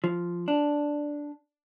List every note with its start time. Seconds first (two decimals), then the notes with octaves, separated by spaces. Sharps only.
0.04 F3
0.48 D4